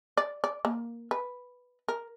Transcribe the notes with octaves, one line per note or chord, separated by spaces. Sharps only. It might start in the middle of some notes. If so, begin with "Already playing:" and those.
D5
D5
A#3
B4
A#4